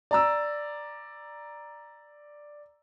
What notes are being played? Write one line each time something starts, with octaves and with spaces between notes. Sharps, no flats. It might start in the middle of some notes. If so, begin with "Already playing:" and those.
D5 A#5 E6